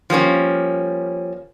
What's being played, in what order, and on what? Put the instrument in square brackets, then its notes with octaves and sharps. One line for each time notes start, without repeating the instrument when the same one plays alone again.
[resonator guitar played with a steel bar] F3 G3 A#3 C#4